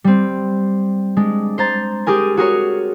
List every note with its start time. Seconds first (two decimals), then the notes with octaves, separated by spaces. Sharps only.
0.04 G3 C4
1.17 G#3 D4
1.58 C5 A#5 A6
2.06 G4 G#4 A#4 G#5
2.37 F#4 G#4 A#4 C#5